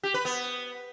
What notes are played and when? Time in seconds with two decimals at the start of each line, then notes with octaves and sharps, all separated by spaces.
0.03 G4
0.14 B4
0.25 B3